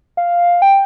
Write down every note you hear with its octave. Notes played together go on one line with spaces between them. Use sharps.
F5
G5